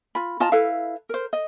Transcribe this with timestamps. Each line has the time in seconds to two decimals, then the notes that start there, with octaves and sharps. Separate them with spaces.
0.15 F4 B5
0.40 F4 D#5 A5 A#5
0.52 E4 A4 B4 F5
1.09 A#4 C5
1.33 D#5